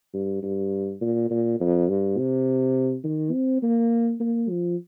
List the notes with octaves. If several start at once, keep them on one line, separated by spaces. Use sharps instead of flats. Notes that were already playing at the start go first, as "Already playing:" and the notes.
G2
G2
A#2
A#2
F2
G2
C3
D#3
C4
A#3
A#3
F3